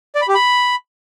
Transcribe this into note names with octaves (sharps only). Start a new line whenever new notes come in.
D5
B5
G4
B5